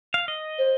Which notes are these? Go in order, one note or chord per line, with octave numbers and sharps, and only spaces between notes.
F5
D#5
C5